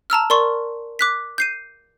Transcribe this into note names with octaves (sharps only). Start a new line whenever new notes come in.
A5 A#5 E6 F6
A#4 D5 C6 C#6
D6 F#6 B6
G6 C7 D#7